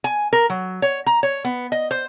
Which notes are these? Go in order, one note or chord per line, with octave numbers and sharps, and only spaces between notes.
G#5
A#4
F#3
C#5
A#5
C#5
B3
D#5
C5